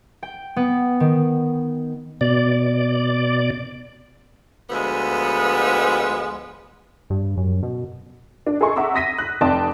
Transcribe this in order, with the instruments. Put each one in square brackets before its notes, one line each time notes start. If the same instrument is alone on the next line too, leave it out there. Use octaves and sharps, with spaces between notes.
[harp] G5
B3
D#3
[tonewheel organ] B2 D5
[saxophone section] D2 F3 G#3 B3
[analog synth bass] G2
F#2
B2
[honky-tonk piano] D4
G#4 A4 D#5 C6 C#6
E5 F#5 A#5 D6 E6
D#6 A#6 B6 D#7
F#6
F1 D5 G5 A5 C6 D#6